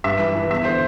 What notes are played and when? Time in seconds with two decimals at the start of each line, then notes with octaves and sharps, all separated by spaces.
0.04 G2 E5
0.19 E3
0.35 E3
0.50 E2 E5
0.65 D3 C5